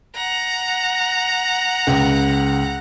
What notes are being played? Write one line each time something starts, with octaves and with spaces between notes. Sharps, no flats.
F#5 A#5
C#2